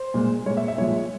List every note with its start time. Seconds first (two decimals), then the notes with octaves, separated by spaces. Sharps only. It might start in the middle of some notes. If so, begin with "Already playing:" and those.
Already playing: C5
0.14 A#2 G#3
0.46 G#3 C#5
0.50 A#2
0.57 E5
0.68 E5
0.78 A#2 F3 G#3 C#5